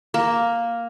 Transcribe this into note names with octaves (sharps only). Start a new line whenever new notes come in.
A#3